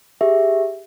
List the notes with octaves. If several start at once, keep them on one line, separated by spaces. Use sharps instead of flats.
G4 G#4 E5